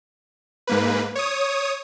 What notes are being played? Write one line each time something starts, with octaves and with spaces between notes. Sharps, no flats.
G#2 A#3 B4
C#5 D#6